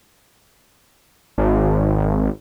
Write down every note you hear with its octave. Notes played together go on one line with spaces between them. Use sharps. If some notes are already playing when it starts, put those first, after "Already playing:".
G#1